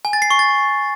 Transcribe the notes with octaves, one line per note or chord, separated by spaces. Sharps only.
G#5
A6
C7
C#6
A6